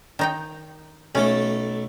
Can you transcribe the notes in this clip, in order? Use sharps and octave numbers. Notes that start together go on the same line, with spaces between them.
D#3 D#4 G5
B1 A3 C#4 A4